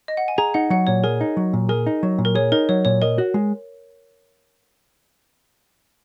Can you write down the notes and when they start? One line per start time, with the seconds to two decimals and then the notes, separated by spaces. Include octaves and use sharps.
0.08 D#5
0.17 F#5
0.28 G#5
0.38 G#4 A#5
0.54 D#4 F#5
0.70 F#3 F#5
0.87 A#2 C#5
1.04 G#4 A#4
1.21 D#4
1.37 F#3
1.53 A#2
1.69 G#4 A#4
1.86 D#4
2.03 F#3
2.18 A#2
2.25 A#4
2.35 G#4 C#5
2.52 D#4 A#4
2.69 F#3 C#5
2.85 A#2 C#5
3.02 A#4 D#5
3.18 F#4
3.34 G#3